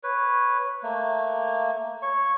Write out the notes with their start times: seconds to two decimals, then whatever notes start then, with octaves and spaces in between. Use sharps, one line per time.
0.03 B4 C#5
0.83 A3 A#3
2.02 C#5 C#6